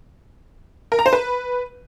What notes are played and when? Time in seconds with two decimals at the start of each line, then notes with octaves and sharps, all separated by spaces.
0.92 A#4
0.99 A#5
1.06 C5
1.13 B4